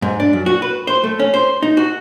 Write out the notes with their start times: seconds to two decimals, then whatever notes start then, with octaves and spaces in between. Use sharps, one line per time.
0.02 G#2
0.20 D4
0.33 F#2
0.46 F#4
0.62 B4
0.87 C5
1.04 A3
1.19 C#4
1.34 C5
1.62 D#4
1.77 F#4